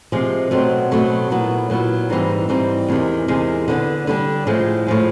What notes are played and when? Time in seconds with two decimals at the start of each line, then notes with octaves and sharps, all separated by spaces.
0.12 C3 F3 G#3
0.51 B2 F#3 A3 C4
0.91 B2 F#3 A3 C4
1.30 A#2 F#3 B3 E4
1.70 A#2 F#3 B3 E4
2.10 G#2 E3 G3 C4 D#4
2.49 G#2 E3 G3 C4 D#4
2.88 E2 C3 D#3 G#3
3.28 E2 C3 D#3 G#3
3.68 D3 G3 B3 D4
4.07 D3 G3 B3 D4
4.47 A2 F3 G#3
4.87 A2 F3 G#3